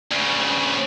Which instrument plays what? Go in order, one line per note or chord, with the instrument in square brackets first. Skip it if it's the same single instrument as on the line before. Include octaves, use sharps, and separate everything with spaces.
[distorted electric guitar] D2 C#3